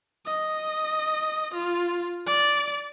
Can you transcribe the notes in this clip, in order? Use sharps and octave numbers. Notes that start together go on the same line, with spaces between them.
D#5
F4
D5